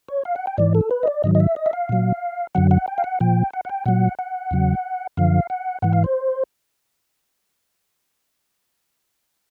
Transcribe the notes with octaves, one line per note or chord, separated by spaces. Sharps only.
C#5
F5
F#5
G5
G#2 E3 D5
A4
B4
D#5
D5
G#2 D#3 F#3 D#5
D#5
E5
D#5
E5
F5
A#2 F#3
F#2 D3 F#3 F#5
F#5
G5
F5
F#5
A#2 F3 G5
F#5
F#5
G5
A#2 F#3 F#5
F#5
E2 C#3 F#3
F#2 D3 F3 F5
F#5
G#2 E3 F#5
F5
C5